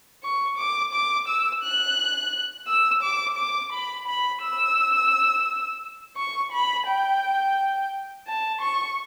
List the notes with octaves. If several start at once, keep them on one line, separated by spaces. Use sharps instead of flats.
C#6
D6
D6
E6
F#6
E6
D6
D6
B5
B5
E6
C#6
B5
G5
A5
C#6